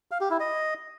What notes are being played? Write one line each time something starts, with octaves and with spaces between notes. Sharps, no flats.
F5
G4
E4
D#5